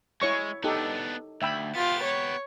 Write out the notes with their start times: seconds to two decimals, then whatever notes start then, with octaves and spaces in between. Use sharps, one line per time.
0.22 G#3 E4 C#5 C#6
0.64 B3 D4 D#4 G4 A4
1.42 D2 E5 G5 B5
1.75 B3 F4 G4 A6
2.05 C#5